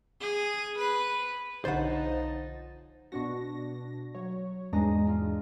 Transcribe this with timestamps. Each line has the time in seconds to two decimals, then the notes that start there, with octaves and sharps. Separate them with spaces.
0.20 G#4
0.78 B4
1.65 B1 D3 F3 D#4 C5 C#5 F#5 A6
3.12 B2 D4 F#4 C#6 A#6
4.15 F#3 C#5
4.73 E2 G#2 G#3 D4 D#5 A#5
5.07 F4